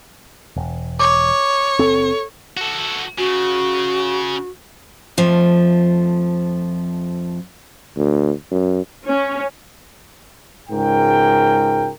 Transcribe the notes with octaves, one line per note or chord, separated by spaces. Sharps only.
E1
C#5 D6
F#1 C4 A4
F#4 A4
C#3 F#4
F2 F3 A3
D2
F#2
C#4
C#2 G#2 A#4 G5